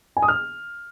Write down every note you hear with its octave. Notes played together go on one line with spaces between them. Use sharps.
G#5
D#6
F6